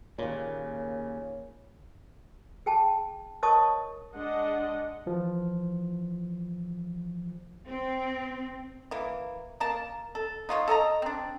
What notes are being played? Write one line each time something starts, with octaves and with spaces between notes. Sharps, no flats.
D#2 A#2 C#3
G#4 G5 A5
A#4 C#5 D#5 A5 C#6 D#6
G#3 D4 D#5 F#5
E3 F3
C4
E3 A#3
A#3 A#4 A5
A4
D#4 F4 F#4 C#5
A4 D#5 A5 A#5
C4 D4